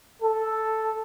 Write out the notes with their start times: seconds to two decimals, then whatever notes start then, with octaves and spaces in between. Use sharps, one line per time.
0.23 A4